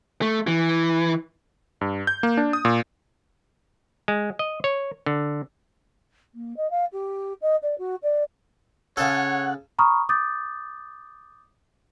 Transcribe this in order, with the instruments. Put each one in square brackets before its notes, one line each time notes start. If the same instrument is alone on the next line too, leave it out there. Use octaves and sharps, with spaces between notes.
[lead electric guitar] A3
E3
[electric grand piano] G2
G6
A#3
D4
D#6
A#2
[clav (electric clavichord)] G#3
D#5
C#5
D3
[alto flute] A#3
D#5
F5
G4
D#5
D5
F#4
D5
[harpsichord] C#3 A4 [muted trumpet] C#5 [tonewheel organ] F#5
[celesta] A#5 B5 C#6 D#6 F6
D6 D#6 G6 A6